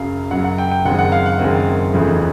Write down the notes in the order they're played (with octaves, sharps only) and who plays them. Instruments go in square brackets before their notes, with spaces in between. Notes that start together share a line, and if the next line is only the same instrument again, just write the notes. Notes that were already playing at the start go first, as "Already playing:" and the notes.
Already playing: [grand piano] F#2 C#3 F#3 F5
F#2 C#3 F#3 F#5
F#5
G5
G5
F#1 F#2 D#3 G#3 C4 F#5
F#5
F5
F#5
F#1 F#2 D#3 G#3 C4
F1 E2 C#3 F3 A3